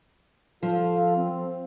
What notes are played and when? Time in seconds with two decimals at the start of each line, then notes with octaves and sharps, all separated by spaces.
0.63 F3 F4 A4 F5
1.16 C4